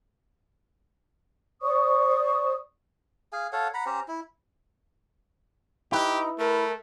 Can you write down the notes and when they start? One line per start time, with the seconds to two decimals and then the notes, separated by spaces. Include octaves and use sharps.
1.62 C5 D5 C#6 D#6
3.33 G#4 F5 G#5
3.52 A4 C#5 F5 F#5
3.74 F#5 A#5 B5
3.86 C#4 G4 C5 A#5
4.08 E4
5.92 D#4 E4 G4 B4
6.39 A3 A#4